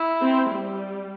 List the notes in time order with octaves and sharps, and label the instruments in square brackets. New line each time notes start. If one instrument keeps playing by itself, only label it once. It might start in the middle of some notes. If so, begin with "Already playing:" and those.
Already playing: [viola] E4
[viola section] C4
G3